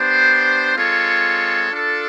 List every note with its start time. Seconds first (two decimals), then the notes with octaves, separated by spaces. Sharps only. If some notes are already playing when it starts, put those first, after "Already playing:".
Already playing: B3 D4 G4 C5
0.75 G#3 C4 F4 A4 C#5
1.70 D4 F4 A4